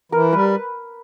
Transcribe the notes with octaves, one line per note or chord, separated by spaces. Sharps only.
E3 A#4
G3 B4